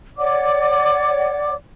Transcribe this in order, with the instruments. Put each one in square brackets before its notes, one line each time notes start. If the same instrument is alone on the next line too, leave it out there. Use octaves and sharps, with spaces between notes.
[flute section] C#5 D5 F#5 D6